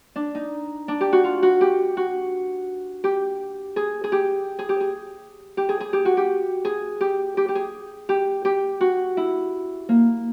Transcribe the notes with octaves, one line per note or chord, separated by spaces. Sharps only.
D4
D#4
D4
G4
F#4
F4
F#4
G4
F#4
G4
G#4
G#4
G4
G#4
G4
G#4
G4
G#4
G#4
G4
F#4
G4
G#4
G4
G4
G4
G#4
G4
G4
F#4
E4
A#3